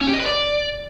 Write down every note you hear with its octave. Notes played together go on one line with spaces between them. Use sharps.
C#4
G4
D#5
B4
D5